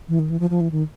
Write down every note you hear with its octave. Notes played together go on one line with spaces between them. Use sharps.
E3
D#3
E3
F3
F3
E3
D#3